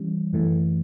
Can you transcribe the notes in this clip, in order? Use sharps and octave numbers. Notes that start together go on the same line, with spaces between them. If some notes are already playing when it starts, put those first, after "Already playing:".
Already playing: E3 G3 C#4 G4
F#2 E3 A3